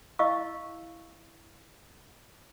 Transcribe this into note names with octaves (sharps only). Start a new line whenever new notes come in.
E4 D#5 F5 C#6 E6